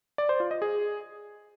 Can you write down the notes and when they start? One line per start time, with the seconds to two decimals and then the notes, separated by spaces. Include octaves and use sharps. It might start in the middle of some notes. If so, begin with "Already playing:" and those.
0.18 D5
0.29 C5
0.40 F4
0.51 D#5
0.62 G#4